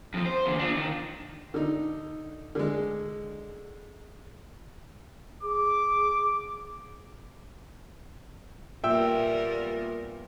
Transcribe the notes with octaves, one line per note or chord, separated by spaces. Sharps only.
F2 F3
C5
E2 D3
D4 F4
D#3
D3 D#4
D3 G#3
G#4 D6
A#2 G3 B3 A#4 E5 G5 E6